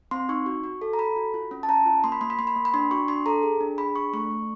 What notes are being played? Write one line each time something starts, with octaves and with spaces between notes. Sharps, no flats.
C4 C6
D#4 C#6
F#4
F#4
A4
A#5
A4 B5
F#4
F4
C#4
A5
C#4 A#5
F4
A#3 C6
B5
A#3 C6
B5
A#3 C6
B5
A#3
B5
D4 C6
F#4 C#6
D4 C6
A4 A#5
G#4
D4
G#4 B5
D4 C#6
A3 C#6
A3